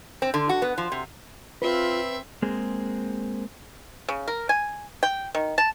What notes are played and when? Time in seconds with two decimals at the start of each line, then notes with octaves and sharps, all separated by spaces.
0.22 C4
0.34 D3
0.49 F#4
0.62 B3
0.78 F3
0.92 C3
1.62 C4 F4 B4 E5
2.42 G#3 A#3 C4 G#4
4.09 C#3
4.28 A#4
4.49 G#5
5.03 G5
5.35 D#3
5.58 A5